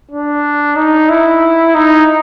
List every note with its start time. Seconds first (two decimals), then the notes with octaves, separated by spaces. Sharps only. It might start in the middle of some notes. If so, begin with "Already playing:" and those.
0.11 D4
0.76 D#4
1.09 E4
1.74 D#4